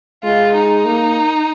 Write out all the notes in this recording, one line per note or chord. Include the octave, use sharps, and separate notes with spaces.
G#3 F4
D#4
A#3